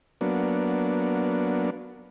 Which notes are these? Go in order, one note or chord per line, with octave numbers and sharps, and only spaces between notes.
F#3 A#3 B3 D4